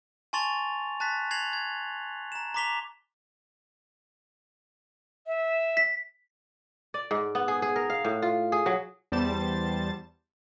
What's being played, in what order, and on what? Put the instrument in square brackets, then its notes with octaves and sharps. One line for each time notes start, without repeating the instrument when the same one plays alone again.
[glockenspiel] G#5 A5 C6 C#6 A6 F7
A5 F#6 A6 B6
G#6 A#6 C7 F7 F#7
G#6
A#5 E7
A#5 C6 D6 B6 F7 G7
[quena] E5
[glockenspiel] B6
[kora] D5
G#2
B3
G#4
G#4
A#4
F5
A2
F4
G#4
F#3
[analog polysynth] E2 G3 C5 A5 A6